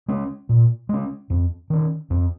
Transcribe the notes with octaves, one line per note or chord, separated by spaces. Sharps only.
G#3 C#4
A#2
G#3 C#4
F2
D#3 C#4
F2